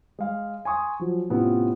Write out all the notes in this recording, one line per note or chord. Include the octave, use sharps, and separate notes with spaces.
G#3 F5
G#5 C6 C#6 D#6
F3 F#3
A2 C3 B3 C#4 E4 F4